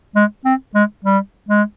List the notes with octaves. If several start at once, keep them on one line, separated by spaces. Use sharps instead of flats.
G#3
C4
G#3
G3
G#3